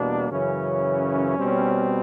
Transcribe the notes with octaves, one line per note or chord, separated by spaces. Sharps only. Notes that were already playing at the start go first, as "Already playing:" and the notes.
Already playing: E2 B2 G3 A#3 D4
F#2 C#3 E3 C#4
B2 G3 C4